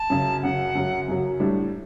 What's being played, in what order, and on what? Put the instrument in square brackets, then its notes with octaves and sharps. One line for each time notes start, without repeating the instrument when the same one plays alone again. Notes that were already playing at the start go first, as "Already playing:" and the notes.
Already playing: [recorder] A5
[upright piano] F#2 C#3 F#3
[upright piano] F#2 C#3 F#3 [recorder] F#5
[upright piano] F#2 C#3 F#3
F#2 C#3 F#3
A2 G3 D4